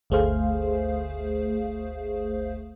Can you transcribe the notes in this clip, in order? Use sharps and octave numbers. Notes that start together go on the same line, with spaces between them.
G1 D2 A3 G#4 C5 F5